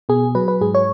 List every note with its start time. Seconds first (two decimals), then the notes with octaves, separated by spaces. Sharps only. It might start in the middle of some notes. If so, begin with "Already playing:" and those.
0.09 B2 G#4
0.35 F#3 B4
0.48 B4
0.61 G#2 G#4
0.75 C#5